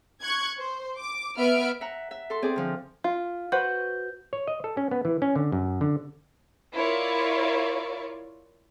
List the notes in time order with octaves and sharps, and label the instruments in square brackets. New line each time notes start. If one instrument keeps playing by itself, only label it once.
[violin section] C#6 F#6 G#6
C5
D6
B3 B4 E5 F6 D7
[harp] E5 F#5 A#5
E5
A4 C6
C4 G#4 D5
D3 F3
[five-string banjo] F4 [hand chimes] F5
[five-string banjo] F#4 B4 C5 [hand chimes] G6
[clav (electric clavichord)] C#5
D#5
A4
C#4
B3
E3
C#4
D3
F#2
D3
[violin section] E4 F4 A#4 C#5 D5